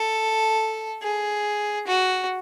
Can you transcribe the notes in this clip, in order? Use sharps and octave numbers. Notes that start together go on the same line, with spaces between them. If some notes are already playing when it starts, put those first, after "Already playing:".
Already playing: A4
G#4
F#4